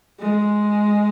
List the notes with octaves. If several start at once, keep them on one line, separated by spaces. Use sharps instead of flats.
G#3